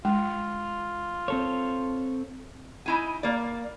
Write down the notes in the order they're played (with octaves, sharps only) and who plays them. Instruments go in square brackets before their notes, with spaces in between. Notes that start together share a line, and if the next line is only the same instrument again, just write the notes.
[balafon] G#3 [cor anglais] F4
[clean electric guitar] C4 A4 C#5
[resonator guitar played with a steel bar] D#4 E4 G#5
A#3 D5